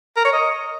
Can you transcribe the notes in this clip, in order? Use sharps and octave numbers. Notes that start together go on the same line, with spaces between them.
A#4
C#5
D#5